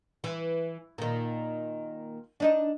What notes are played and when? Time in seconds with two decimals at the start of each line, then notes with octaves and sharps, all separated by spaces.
0.24 E3
0.98 A#2 D#3
2.40 D4 D#4 D#5